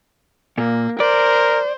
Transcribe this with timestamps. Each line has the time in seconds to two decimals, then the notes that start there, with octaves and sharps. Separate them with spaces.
0.58 A#2 A#3
1.00 A#4 C5 D5